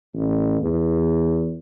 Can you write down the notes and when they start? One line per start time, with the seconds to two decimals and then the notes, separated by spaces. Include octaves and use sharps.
0.14 A1
0.60 E2